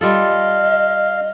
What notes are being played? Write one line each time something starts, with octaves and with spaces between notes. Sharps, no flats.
G3 F4 A4 D#5 F5